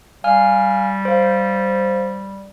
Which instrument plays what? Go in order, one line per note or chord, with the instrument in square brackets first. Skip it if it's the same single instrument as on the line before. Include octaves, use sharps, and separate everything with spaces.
[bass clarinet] G3 [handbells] F5 G#5 F6
[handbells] C5 F5